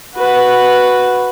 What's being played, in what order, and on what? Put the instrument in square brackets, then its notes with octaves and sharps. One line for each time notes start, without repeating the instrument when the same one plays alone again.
[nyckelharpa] F#4 B4